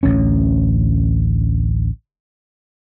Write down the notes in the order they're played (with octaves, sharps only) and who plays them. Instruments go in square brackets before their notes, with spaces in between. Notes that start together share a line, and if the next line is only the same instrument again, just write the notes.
[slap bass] A1 D2 C#4